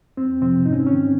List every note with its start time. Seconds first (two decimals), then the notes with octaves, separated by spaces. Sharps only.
0.17 F2 C4
0.41 C3 F3 C4
0.66 G#2 D#4
0.72 C#4
0.80 C4
0.87 D#3 C#4